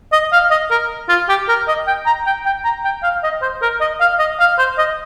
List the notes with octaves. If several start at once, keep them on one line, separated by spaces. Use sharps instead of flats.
D#5
F5
D#5
A#4
F4
G4
A#4
D#5
G5
A#5
G5
G5
A#5
G5
F5
D#5
C5
A#4
D#5
F5
D#5
F5
C5
D#5